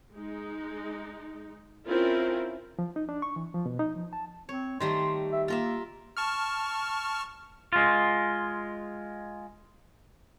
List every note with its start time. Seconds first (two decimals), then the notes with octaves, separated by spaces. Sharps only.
0.13 G#3 D#4
1.87 C4 C#4 E4 F4 A#4
2.79 F3
2.96 D#4
3.09 D4
3.22 C#6
3.36 E3
3.54 F3
3.66 B2
3.79 D#4
3.95 F3
4.13 A5
4.49 C4 C#5
4.80 D#3 G3 A3 C6
5.32 E5
5.48 A#3 F4 A#4 E5
6.17 A5 C#6 F6
7.73 G#3 F4